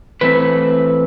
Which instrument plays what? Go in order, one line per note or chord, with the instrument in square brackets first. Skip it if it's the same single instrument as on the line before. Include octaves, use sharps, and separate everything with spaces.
[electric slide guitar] E3 A3 C4 B4